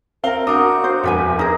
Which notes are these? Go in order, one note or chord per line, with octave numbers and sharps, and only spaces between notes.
C4 A#4 F5 G7
D4 F#4 A#4 D#6 G6
C5
E1 F2 D4 B4 G#5
D#4 G#4 A#4